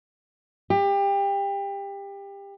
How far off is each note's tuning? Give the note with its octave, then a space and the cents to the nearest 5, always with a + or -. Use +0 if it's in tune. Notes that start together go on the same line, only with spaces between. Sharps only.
G4 +25